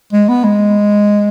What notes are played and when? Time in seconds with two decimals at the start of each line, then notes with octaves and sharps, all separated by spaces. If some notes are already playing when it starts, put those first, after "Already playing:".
0.13 G#3
0.28 B3
0.44 G#3